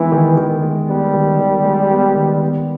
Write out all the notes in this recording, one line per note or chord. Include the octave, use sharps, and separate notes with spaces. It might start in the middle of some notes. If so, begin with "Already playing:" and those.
Already playing: D#3 E3 G#3 B3
D#3
D#3
G#3
G3 B3
D#3
D#3
G#3
B3
D#3
B3